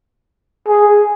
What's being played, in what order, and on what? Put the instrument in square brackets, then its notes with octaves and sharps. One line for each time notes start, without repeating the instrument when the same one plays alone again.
[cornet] G#4